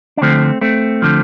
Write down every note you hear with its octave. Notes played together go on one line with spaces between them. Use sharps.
D4
D2 D3 F3 A3 C4
A3 C4
D3 F3